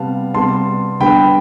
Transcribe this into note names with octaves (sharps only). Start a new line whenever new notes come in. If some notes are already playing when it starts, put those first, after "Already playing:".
Already playing: C3 G3 B3 F5 A5
C3 G3 B3 A5 C6
D3 G3 B3 G5 B5